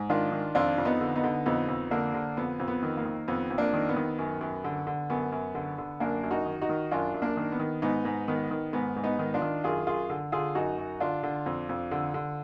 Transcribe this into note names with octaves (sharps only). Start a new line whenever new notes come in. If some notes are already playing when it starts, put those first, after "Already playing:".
Already playing: G#2
D#3 D4 F4
D#3
F2 D4 F4
F2
B3 D#4
D3
B3 D#4
D3
F2 B3 D#4
F2
D3 A#3 D4
D3
F2 B3
F2
B3
D#3
A#3
D#3
F2 B3
F2
A#3 D4
D#3
B3
D#3
F#2
F#2
D3
D3
F#2 B3
F#2
D3
D3
F#2 A#3 D4
F#2
D#4 F#4
D#3
D#4 F#4
D#3
F#2 D4 F4
F#2
A#3 D4
D#3
B3
D#3
G#2 B3 D#4
G#2
D#3 B3
D#3
G#2 B3
G#2
B3 D#4
D#3
D4 F4
D#3
F#2 F4 G#4
F#2 F4 G#4
D3
D3 F4 G#4
F#2 D#4 F#4
F#2
D3 D4 F4
D3
F2
F2
D3
D3